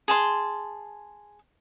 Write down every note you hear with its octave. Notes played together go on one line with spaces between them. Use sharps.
G#4 A5 C6